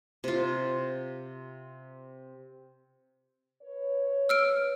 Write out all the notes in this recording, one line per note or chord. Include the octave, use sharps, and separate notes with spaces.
C3 F4
B4 C#5
E6 F6 D7